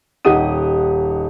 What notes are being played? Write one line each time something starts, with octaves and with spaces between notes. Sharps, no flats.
D#1 D#4 G4 F#5 D#6 D#7